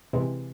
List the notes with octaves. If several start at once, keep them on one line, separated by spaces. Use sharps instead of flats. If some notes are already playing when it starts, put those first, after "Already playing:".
C3 E3 G#3 C4